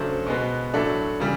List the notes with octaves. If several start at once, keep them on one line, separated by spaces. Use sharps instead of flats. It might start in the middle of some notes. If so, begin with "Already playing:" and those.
Already playing: C#3 F#3 A3 D4 C5
B2 G#3 B3
A2 F#3 A3 D4
C#3 E3 G3